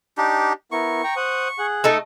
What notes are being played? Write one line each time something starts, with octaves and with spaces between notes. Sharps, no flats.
D4 D#4 G4
B3 E4 A#4 C#6
G5 A#5
C5 F#5 D#6
G#4 F#5
A3 D#4 A4